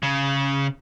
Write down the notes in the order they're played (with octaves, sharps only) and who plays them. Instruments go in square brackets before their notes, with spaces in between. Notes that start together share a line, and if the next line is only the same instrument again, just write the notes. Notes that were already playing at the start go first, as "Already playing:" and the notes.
[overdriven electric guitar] C#3